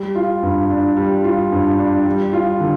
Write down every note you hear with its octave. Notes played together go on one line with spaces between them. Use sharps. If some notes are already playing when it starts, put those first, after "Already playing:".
Already playing: G3
F4
G2
D4
G3
F4
G2
D4
G3
F4
D3